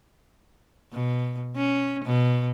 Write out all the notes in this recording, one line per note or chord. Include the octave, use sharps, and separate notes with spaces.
B2
C#4
B2